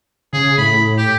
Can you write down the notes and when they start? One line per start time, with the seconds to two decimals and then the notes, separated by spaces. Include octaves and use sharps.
0.33 C#3 G#4
0.58 A2 B5
0.98 G4